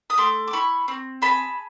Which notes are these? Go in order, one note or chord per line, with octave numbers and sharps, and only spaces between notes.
D#6
A3 C6 D6
D6
E4 B5 C#6
C4
G#4 A5 B5